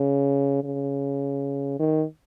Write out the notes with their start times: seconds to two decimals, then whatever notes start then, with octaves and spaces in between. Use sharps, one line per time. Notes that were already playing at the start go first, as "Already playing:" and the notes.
Already playing: C#3
0.64 C#3
1.79 D#3